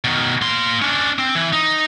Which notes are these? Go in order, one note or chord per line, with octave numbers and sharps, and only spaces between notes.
B2 D#3
A#3 C6
C#4 D4
C4
E3
D#4